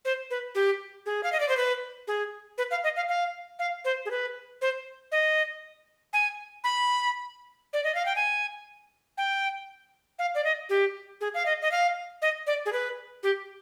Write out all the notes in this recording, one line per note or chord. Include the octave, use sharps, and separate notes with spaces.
C5
B4
G4
G#4
F5
D#5
D5
C5
B4
G#4
B4
F5
D#5
F5
F5
F5
C5
G#4
B4
C5
D#5
G#5
B5
D5
D#5
F5
G5
G#5
G5
F5
D5
D#5
G4
G#4
F5
D#5
D#5
F5
D#5
D5
G#4
B4
G4